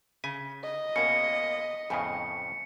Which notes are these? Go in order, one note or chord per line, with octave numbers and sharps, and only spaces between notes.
C#3 G#5 B6
D#5
B2 G#3 A#3 C#4 C#7
F2 A2 C#3 B3 C4 G#5